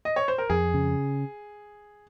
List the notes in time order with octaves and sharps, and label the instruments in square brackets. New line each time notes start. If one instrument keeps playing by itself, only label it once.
[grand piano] D#5
C#5
C5
A#4
[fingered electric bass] F2 [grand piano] G#4
[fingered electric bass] C#3